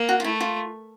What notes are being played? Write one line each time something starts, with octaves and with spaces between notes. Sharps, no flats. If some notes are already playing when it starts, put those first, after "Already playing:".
Already playing: A#3
F#4
F4
A3 E4
F4